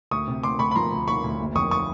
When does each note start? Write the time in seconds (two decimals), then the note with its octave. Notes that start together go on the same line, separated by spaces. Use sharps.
0.11 D2 C#6 D#6
0.28 C3
0.43 D2 C6 D6
0.59 D2 B5 C#6
0.71 B5
0.75 F3 A#5 C6
0.91 D2
1.08 D2 B5 C#6
1.24 D2
1.40 F#1
1.55 F2 C#6 D#6
1.71 C#6 D#6